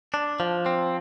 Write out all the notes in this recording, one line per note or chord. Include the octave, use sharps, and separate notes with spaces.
D4
F3
C4